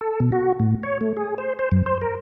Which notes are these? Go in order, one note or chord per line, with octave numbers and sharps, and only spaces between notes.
A4
B2
F#4
A2
C#5
A3
G#4
C5
C5
F#2
C5
A#4